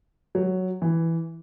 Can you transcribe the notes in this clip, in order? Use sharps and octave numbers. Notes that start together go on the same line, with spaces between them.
F#3
E3